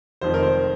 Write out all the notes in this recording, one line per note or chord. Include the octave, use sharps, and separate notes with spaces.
F1 F2 D#3 C5
A#4
C5